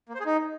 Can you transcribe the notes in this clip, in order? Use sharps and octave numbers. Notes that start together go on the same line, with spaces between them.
A#3
C5
G#4
D#4